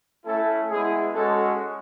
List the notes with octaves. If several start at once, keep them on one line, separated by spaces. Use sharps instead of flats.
A3 C#4 E4 A4
G#3 B3 E4 G#4
G#3 C#4 F#4 A4